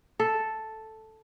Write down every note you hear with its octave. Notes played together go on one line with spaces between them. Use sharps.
A4